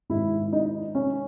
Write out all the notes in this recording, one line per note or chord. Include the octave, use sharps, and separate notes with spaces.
G#2 D#3 G#3 E4
D#4
C#4